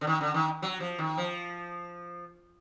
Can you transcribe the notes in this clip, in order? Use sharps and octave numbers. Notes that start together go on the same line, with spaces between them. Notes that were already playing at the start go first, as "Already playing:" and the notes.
D3
D#3
D3
D#3
F#3
F3
D#3
F3